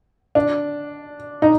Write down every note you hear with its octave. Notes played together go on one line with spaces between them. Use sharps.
D4
D#4